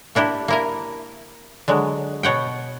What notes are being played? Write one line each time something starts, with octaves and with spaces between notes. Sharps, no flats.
A#3 D4 E4 G4
A#3 E4 A#4
D3 F#3 G#3
B2 C#5 F#5 G5